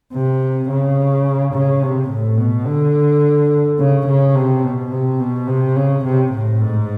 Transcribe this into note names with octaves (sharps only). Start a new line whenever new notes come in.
C3
C#3
C#3
C3
A2
B2
D3
C#3
C#3
C3
B2
C3
B2
C3
C#3
C3
A2
G#2